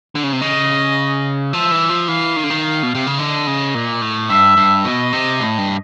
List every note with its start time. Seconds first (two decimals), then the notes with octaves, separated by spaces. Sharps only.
0.15 D3
0.23 C#3
0.33 C3
0.42 C#3 D#5
1.53 F3 E5
1.71 E3
1.89 F3
2.08 E3 F5
2.36 D#3
2.44 D3
2.50 D#3
2.63 F5
2.83 B2
2.95 C3
3.07 C#3
3.19 D3 D#5
3.47 C#3
3.75 A#2
4.02 A2
4.29 G2 E5
4.57 G2
4.85 B2 D#5
5.13 C3
5.40 A2
5.58 G2